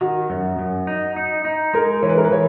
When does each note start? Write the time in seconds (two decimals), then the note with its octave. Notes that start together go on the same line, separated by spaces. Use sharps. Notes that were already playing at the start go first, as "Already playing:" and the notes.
0.01 D#3 F#4
0.30 F#2
0.59 F#2
0.87 D#4
1.16 D#4
1.45 D#4
1.74 G#3 A#4
2.03 E3 C#5
2.09 B4
2.18 A#4
2.24 B4
2.32 E3 C#5